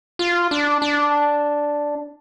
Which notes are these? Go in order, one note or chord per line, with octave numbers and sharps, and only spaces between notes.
F4
D4
D4